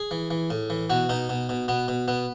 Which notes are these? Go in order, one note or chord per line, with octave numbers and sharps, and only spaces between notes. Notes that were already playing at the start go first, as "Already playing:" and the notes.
Already playing: G#4
E3
E3
A2
E3
B2 F#4
B2 D#4
B2
B2
B2 B3
B2
B2 B3